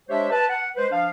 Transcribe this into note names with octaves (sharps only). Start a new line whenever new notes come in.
G#3 D4 G4 C5 C#5 E5
B4 A5
F#5
G#3 B4 C5
F3 D4 F5